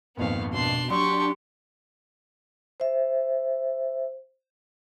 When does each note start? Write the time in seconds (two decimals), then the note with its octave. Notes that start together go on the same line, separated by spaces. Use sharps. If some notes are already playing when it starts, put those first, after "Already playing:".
0.17 G#1 F2 A#2 B3 F5
0.53 B2 D4 C6
0.90 F#3 D4 G4 C6 C#6
2.80 C5 E5